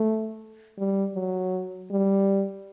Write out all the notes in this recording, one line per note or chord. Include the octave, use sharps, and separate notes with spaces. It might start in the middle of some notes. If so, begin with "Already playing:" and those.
Already playing: A3
G3
F#3
G3